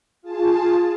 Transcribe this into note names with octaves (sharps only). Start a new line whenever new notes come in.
F4 G#4 A5